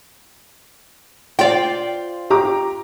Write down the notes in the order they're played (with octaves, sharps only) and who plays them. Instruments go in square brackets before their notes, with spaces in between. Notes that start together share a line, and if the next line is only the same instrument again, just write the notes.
[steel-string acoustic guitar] F4 C5 F5 [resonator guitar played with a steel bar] D5 G5
[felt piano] G4 A#5 D6